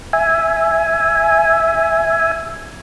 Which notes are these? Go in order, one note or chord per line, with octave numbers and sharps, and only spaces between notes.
E5 G#5